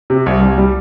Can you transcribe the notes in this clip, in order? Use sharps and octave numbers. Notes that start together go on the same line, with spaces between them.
C3
C2
C2
G3